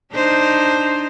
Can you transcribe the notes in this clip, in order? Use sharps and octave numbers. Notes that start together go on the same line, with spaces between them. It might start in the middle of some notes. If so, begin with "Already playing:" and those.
D4 D#4 C5